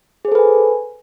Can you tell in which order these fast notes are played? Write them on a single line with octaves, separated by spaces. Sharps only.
G#4 C5 A4 B4 G#5